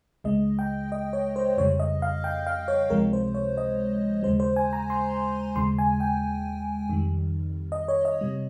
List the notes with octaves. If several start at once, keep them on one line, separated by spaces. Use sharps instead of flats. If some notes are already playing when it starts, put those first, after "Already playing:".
C#2 C#3 G#3 D#5
G5
D#5
C#5
C5
F2 C#3 G3 C#5
D#5
F5
G5
F5
C#5
C#2 C3 F3 G#3 A#4
C5
C#5
D#5
D#2 C#3 G#3 C5
C5
G#5
A#5
C6
D#2 C#3 G#3 C6
G#5
G5
F2 D#3 G3
D#5
C#5
D#5
C3 G3